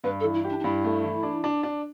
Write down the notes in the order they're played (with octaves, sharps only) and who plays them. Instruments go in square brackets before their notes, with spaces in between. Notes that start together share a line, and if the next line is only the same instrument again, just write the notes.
[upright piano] G2 [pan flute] B4
[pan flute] A4
[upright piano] E3
[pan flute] E4
[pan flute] D4 [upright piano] G4
[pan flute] D4
[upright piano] G2 [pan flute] E4
[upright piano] A3
E3
D4
D4
D4